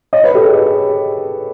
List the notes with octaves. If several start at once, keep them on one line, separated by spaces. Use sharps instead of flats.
C#5 D#5
B4 C#5
G4 A4
G#4